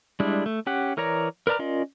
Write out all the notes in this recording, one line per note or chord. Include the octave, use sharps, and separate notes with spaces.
G3 G#3 D4 E4
A3
C#4 G4 F#5
E3 A#4 C#5 D5 A#5
A#4 B4 D5 A#5 F6
C#4 F4 A#4 D5 D#5